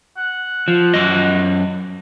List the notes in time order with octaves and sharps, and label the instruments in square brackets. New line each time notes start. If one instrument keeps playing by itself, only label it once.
[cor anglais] F#5
[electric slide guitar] F3
F#2 D#5